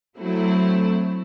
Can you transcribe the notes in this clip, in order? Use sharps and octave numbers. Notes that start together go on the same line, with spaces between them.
F#3 A3 C4 E4